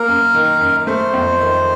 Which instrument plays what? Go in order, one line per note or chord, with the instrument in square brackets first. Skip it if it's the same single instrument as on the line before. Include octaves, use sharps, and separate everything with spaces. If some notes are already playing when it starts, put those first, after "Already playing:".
Already playing: [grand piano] A#3 [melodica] A#4
[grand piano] F#2
D#3
F#2
[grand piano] A3 [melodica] C5
[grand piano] F2
D#3